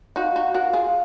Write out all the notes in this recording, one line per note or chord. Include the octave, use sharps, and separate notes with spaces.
D#4 F#4 F5
D#4 F#4
F#4 A#4
F4 G#4